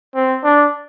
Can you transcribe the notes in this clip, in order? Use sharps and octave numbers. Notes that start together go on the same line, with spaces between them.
C4
D4